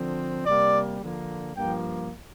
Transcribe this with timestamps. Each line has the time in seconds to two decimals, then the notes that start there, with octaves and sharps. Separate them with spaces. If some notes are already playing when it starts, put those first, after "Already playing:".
Already playing: D3 F3 C4
0.46 C3 G3 A#3 D5
1.01 D3 F3 A#3
1.56 G2 F3 A#3 G5